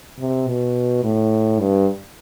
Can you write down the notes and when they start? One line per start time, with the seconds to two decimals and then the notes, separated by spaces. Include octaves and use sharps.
0.19 C3
0.47 B2
1.04 A2
1.59 G2